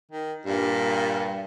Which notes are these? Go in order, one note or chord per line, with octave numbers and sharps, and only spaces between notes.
D#3
G2 A#2